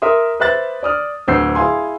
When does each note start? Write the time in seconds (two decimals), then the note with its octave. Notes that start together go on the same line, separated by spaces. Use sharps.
0.02 A#4 E5 C6 D#6
0.40 B4 C5 E5 F#6 A6
0.83 D5 D#6 F6
1.28 D1 D2 E6 G6 C7
1.55 E4 G#4 F5 G#5 C6